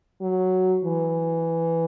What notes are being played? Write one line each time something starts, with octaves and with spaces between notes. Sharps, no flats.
F#3
E3